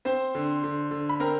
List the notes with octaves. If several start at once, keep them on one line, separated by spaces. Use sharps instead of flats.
C4 C5 C6
D3
D3
D3
B5
C4 A#4 A#5